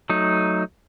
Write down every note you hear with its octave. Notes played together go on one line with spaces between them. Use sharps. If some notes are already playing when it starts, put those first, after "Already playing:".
F#3 A3 D#4